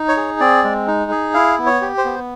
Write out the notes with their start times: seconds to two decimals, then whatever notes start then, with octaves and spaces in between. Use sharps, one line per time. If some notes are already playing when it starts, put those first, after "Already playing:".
Already playing: D#4
0.08 C#5
0.17 G#4
0.40 C4 D5
0.64 G#3
0.87 D#4
1.11 G#4
1.34 E4 F5
1.59 B3
1.66 C#5
1.81 G4
1.98 C5
2.05 B3